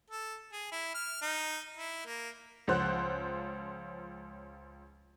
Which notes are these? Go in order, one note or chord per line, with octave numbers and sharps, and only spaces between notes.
A4
G#4
E4
F6
D#4
E4
A#3
C#2 F3 C#4 C5 F#5 F#6